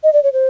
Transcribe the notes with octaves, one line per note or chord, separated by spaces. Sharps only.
D#5
D5
C#5
C5